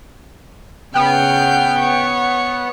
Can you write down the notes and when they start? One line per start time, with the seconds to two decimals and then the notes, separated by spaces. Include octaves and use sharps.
0.95 C#3 B3 G5 F6 G6
1.79 C#5